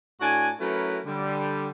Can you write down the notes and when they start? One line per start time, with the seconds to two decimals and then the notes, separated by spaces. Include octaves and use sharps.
0.21 A2 D4 F#4 G#5
0.61 F#3 A3 C#4 E4 A#4 B4
1.06 D3 G3